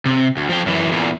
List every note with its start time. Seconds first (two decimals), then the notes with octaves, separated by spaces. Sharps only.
0.06 C3
0.37 D2
0.50 F3 G5
0.66 F#2 E3
0.92 E2 A#2